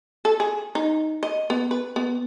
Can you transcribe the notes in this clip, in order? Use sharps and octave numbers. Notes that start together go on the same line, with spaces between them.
A4
G#4
D#4
D#5
B3
B4
B3